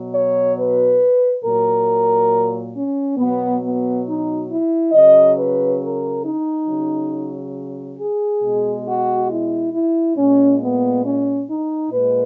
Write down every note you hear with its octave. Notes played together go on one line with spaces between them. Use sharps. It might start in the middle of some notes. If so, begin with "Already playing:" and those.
Already playing: B2 F#3
C#5
B4
A#2 F#3 A#4
C#4
B2 F#3 B3
B3
D#4
E4
C#3 F#3 D#5
B4
A#4
D#4
C#3 F#3
G#4
B2 G#3
F#4
E4
E4
A#2 G#3 C#4
B3
C#4
D#4
A#2 G#3 B4